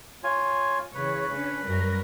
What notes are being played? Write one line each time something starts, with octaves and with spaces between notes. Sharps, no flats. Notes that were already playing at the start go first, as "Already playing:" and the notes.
F4 C#5 G#5
C#3 E3 B4 C#5
C#4 D4
F#2 G3 A#4